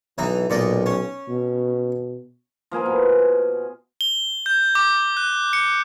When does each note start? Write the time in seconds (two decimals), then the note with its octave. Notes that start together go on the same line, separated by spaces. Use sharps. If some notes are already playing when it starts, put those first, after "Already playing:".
0.18 B1 E3 D#4
0.50 B1 A#2 D5 D#5
0.86 C#4
1.29 B2
2.71 F3 A#3 G#4 A#4
2.86 B2
4.01 G7
4.46 G6
4.75 D6
5.17 F#6
5.53 C#7